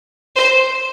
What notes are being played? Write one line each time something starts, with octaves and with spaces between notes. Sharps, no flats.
C5